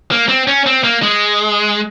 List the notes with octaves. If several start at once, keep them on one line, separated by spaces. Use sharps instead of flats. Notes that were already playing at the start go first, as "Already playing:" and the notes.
A#3
C4
C#4
C4
A#3
G#3